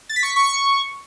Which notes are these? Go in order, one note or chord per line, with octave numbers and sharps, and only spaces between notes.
A6
B6
C#6
B6
C#6